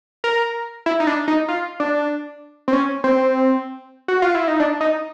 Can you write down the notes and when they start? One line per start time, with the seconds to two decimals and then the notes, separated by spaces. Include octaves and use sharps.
0.24 A#4
0.86 E4
1.00 D#4
1.07 D4
1.28 D#4
1.48 F4
1.80 D4
2.68 C4
2.73 C#4
3.04 C4
4.08 F#4
4.22 F4
4.35 E4
4.48 D#4
4.60 D4
4.81 D#4